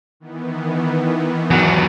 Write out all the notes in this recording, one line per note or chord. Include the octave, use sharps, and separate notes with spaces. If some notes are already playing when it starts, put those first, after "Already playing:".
D#3 E3 B3
E2 F#3